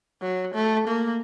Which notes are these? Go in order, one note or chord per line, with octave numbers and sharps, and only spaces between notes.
F#3
A3
A#3